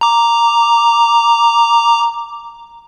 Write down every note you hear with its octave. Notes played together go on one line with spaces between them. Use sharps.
A#5 D6